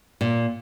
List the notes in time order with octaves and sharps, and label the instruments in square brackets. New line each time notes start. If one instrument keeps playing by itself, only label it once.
[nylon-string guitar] A#2